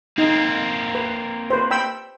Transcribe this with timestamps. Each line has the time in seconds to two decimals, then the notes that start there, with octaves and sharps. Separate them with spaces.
0.18 A#3 C4 D#4
0.95 B4
1.50 B4 C5
1.71 G5 B5 E6